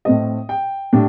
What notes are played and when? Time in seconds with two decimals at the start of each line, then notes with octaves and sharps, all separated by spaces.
0.05 A2 A3 C4 D#5
0.49 G5
0.93 A2 G3 D4